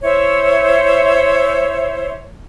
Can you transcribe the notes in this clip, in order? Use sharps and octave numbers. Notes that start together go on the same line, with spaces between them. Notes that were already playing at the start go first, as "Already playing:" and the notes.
E4 C5 C#5 E5